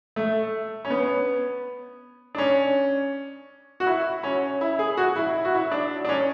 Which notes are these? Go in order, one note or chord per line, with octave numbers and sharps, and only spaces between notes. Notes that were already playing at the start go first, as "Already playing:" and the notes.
A3
C#4
B3
D4
C#4
F#4
E4
C#4
E4
G#4
F#4
E4
E4
F#4
E4
D4
D4
C#4